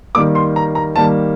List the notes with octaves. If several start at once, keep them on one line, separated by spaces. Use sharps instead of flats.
D#3 G3 A#3 D6
C6
A#5
A#5
D#3 G3 A#3 A5